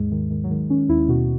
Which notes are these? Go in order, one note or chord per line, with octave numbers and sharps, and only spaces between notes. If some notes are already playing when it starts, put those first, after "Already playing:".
Already playing: D#2 G#2 G#3
D#3 G#3
D#3 G#3
F#3
D#3 G#3
D#3 C#4
D#2 E4
B2 F#4